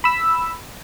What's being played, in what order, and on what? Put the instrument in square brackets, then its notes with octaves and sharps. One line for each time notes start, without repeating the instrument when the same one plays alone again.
[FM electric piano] B5 E6